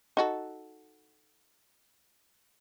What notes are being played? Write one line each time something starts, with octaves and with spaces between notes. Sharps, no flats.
D#4 F#4 A4